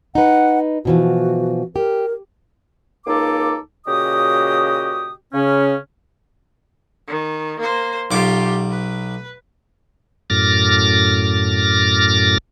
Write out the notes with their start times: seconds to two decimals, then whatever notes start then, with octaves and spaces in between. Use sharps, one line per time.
0.15 D#4 B4 F#5
0.85 B2 E3 F3 F#4
1.76 G4 A#4
3.07 C#2 A#3 D#4 A4 D6
3.88 A#2 C#3 F#4 G4 D#5 D#6
5.34 C#3 C#4
7.08 D#3
7.60 A#3 C5
8.11 B1 F4 G4 D6
8.70 B4
10.30 F#2 A2 D6 F6 A6 A#6